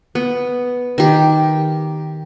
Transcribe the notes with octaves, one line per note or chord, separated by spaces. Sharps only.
B3
D#3 G4